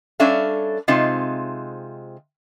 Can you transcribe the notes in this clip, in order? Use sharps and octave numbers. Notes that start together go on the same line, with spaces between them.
G3 C#4 D4 A4 E5 F5
C3 G#3 C4 D#4 F4